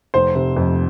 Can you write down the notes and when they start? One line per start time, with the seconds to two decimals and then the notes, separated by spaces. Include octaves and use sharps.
0.14 F1 C5
0.35 C3
0.56 F2